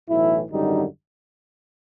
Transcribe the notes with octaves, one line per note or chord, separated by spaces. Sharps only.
B1 A2 E3 E4
G#1 F#2 D3 G3 D#4